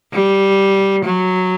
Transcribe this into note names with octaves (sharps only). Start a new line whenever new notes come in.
G3
F#3